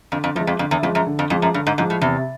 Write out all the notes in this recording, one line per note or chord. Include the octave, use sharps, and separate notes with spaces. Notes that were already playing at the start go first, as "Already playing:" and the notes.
F2 D3
F2
E2 F3 G#3
F2
F2 D3
E2
F2 F3 G#3
F#2
D3
F2
F2 F3 G#3
F#2
G2 D3
G#2
G#2 F3 G#3
A2
E2 C3